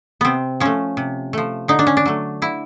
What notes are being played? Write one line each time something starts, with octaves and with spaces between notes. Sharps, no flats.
C3 B3 C4
F3 A3 C#4
C3
F3 A3
D3 D#4
D4
C#4
D4
F#3 A3
D3 E4